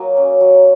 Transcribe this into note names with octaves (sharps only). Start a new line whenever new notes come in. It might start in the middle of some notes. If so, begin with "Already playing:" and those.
Already playing: F#3 A#3 D#5 G#5 A#5
C#4
F#3